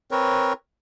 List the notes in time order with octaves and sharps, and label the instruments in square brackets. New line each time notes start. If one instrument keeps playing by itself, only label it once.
[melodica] C4 A#4 B4 C#5